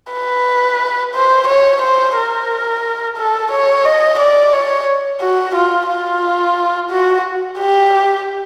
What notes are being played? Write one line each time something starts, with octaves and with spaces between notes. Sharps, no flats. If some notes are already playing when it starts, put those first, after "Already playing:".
B4
C5
C#5
C5
A#4
A4
C#5
D#5
D5
C#5
F#4
F4
F4
F#4
G4